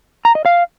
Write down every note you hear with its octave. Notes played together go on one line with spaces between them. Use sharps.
A#5
D#5
F5